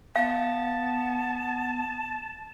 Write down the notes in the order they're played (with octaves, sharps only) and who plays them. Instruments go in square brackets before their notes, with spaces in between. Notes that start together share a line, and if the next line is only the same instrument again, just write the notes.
[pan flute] B3 [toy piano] F5 [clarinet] A5